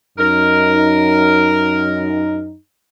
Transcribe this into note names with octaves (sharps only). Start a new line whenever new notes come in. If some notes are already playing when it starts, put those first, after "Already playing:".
F#2 D#4 A#4